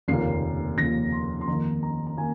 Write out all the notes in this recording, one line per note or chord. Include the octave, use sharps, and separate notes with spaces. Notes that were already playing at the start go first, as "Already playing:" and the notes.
F1 D#2 C#3 F3 A#3 C7
F1 D#2 C#3 F3 A#3 A#6
C6
C6
F2 D#3 A#3 A#5
A#5
A#5
D#3 A#3 G#5